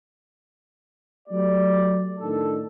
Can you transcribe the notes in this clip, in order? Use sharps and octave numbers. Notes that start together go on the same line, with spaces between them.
F#3 A3 G4 D5
A2 D#3 D4 A4